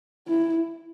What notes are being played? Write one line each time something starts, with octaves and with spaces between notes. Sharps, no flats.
E4